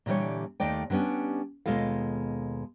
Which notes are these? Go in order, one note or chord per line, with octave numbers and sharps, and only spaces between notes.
A#2 D3 E3 G3 G4 C#5
D#2 D#3 A3 D5 G5
D3 G3 B3 C#4 D4
D#2 B2 G#3 F4 A4 F5